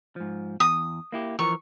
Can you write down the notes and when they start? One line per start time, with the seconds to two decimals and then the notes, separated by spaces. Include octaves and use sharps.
0.16 G#2 F3
0.60 E2 D#6
1.12 A#3 E4 G4
1.39 E3 F3 A#4 C#6